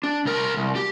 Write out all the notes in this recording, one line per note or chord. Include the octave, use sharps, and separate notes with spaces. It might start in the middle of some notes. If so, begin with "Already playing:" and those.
D4
C2 A#4
C2
G4